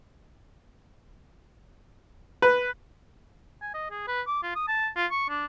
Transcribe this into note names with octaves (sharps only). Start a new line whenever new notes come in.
B4
G#5
D#5
G#4
B4
D6
F4
D#6
A5
F4
C#6
D4